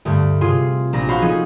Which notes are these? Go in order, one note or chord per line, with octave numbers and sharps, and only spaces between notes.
D2 G2 A3
C3 F4 G#4 C6
A#1 D4 A#5 A#6
F#4 C5 C#5 F5 B5 C6
F3 C#4 D#4 G#4 A4